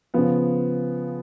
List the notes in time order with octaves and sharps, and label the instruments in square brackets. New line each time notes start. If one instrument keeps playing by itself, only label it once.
[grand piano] C#3 F3 B3